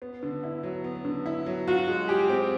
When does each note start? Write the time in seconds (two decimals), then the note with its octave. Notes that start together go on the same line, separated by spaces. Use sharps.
0.02 B3
0.23 D3
0.43 E4
0.63 F#3
0.84 B3
1.05 D3
1.26 E4
1.46 F#3
1.68 F4 F#4
1.88 G#3
2.08 G4 G#4
2.29 C4